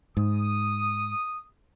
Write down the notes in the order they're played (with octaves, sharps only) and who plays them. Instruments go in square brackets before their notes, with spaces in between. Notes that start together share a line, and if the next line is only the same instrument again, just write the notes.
[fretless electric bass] G#2 [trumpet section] D#6